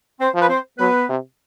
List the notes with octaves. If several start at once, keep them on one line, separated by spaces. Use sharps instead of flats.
C4 C5
F3
B4
C4 C5
F#3 B3 B4
C3